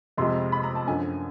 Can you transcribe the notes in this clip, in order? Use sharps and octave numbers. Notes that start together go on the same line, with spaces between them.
F2 C3 F3 G#3 C6
B5
A#5
A5
F#2 D3 F3 G#5